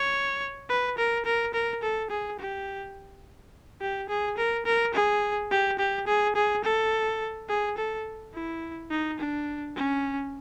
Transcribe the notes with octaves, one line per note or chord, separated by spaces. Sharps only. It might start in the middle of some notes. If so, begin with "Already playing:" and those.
Already playing: C#5
B4
A#4
A#4
A#4
A4
G#4
G4
G4
G#4
A#4
A#4
G#4
G4
G4
G#4
G#4
A4
G#4
A4
E4
D#4
D4
C#4